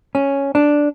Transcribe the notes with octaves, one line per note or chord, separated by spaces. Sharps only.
C#4
D4